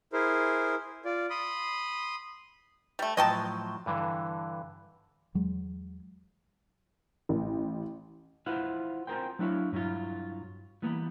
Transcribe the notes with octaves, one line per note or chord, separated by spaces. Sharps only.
E4 G#4 A#4 C5
F4 D5
B5 C6 D#6
G3 A3
A2 F3 F#3 D#5 G5 A5
G2 D3 E3
E2 F#3 G#3
A1
E4 F4 B4 C5 F5 F#5
C4 F4 G#4 A#4 C5 G5
F#3 D4 E4 C#5 F5
G2 F#3 E4 F4
E3 G3 A#3 B3